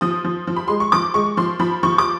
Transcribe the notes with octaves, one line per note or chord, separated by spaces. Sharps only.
F3 D#6
F3
F3
B5
G#3 C6
C#6
F3 D6
G#3 C#6
F3 C6
F3 B5
F3 C#6
D6